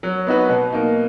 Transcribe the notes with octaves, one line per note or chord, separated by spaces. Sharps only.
F#3
B3 D#4 F#4 B4
B2
A#3 D#4